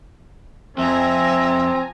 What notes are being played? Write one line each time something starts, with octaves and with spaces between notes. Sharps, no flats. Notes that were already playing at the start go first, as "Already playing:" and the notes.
F2 F3 C4 E5 G#5 A#5